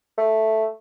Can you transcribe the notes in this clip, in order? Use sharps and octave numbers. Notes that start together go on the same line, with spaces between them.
A3